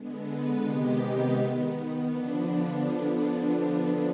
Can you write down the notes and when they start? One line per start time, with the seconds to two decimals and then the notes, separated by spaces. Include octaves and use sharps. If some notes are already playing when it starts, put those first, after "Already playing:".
Already playing: D3 G#3 B3
0.26 B4
0.62 C3 D#3 G#3 B3 G4
0.99 D#4
1.35 D#3 B3
2.08 D3 F3 B3 D4